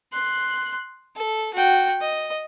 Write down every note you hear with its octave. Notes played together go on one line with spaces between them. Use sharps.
C6 F#6
A4
F#4 G5
D#5